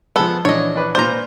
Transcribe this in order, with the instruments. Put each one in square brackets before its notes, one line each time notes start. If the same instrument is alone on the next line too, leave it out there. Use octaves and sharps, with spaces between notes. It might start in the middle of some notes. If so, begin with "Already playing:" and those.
[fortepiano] F3 G#3 [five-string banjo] B3 A4
[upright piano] A#1 E3 [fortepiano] D4 [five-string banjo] C#5 D#5
[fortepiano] D4 B4 D6
[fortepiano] A#2 F4 D5 [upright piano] B4 [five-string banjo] C5 A#5